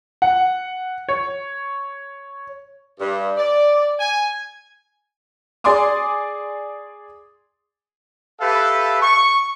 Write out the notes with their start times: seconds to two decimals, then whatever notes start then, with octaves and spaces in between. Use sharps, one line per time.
0.22 F#5
1.09 C#5
2.99 G2
3.37 D5
3.99 G#5
5.64 G#4 D5 G#5 C6 D6 D#6
8.41 G4 A4 B4 E5 F5
9.02 C#6